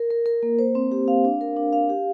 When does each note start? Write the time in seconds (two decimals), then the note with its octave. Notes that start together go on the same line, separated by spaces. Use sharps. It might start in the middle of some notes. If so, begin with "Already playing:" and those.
Already playing: A#4
0.10 A#4
0.26 A#4
0.43 A#3
0.59 C5
0.75 C4
0.92 G4
1.08 F5
1.25 D4
1.41 A#4
1.57 D4
1.73 F5
1.89 G4